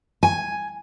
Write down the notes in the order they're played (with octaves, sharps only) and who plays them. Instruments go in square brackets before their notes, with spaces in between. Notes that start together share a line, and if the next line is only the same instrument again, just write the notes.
[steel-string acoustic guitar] G#5